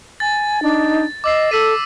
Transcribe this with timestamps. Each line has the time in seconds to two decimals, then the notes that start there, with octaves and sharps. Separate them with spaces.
0.20 G#5 A6
0.62 D4 D#4
1.24 D#5 D6 E6 C7
1.51 A4 E6 B6 D#7